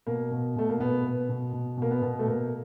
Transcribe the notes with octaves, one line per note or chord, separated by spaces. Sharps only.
B2 A#3
B2
B2 A3
A#3
B2 B3
B2
B2
B2
B2 A#3
B3
B2
A3
B2 A#3